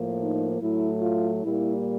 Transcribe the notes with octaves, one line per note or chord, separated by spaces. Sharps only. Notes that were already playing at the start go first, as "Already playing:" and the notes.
Already playing: A2 F3 A#3
D#4
A2 F#3 A3 E4
F4
A#2 G3 A#3 E4